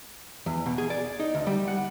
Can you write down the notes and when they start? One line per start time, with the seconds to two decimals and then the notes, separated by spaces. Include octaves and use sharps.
0.46 E2
0.66 B2
0.78 G#4
0.90 D5
1.20 D#4
1.35 D2
1.47 G3
1.68 F#5